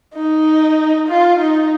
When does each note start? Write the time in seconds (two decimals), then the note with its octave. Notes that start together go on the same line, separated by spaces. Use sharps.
0.14 D#4
1.08 F4
1.40 D#4